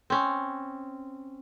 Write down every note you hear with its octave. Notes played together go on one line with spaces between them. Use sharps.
C4 C#4